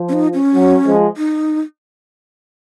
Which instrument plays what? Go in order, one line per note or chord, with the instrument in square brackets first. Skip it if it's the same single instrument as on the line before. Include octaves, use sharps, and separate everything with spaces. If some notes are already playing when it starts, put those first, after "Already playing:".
Already playing: [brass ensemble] F3
[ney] C#4
D#4
C#4
[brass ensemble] F#3
F3 G#3
[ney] D#4